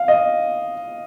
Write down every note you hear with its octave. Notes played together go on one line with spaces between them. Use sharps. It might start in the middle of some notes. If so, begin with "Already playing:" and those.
Already playing: F5
D#5